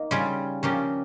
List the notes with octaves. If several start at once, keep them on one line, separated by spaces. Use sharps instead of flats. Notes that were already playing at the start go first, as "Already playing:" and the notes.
Already playing: A#3 D#4
C#3 G3 C#4 F4 G#4
C#3 F3 A#3 C#4 G4